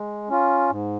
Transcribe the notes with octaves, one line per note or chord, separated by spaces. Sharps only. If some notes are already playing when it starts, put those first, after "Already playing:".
Already playing: G#3
C#4 F4
G#2